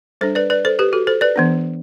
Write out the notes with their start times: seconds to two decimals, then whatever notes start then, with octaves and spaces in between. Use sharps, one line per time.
0.21 G3 D4 A4 C5
0.35 B4 D5
0.50 B4 D5
0.65 A4 C5
0.79 G4 B4
0.93 F#4 A4
1.07 A4 C5
1.21 B4 D5
1.36 E3 B3 D4